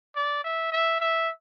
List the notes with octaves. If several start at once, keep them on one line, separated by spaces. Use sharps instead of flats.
D5
E5
E5
E5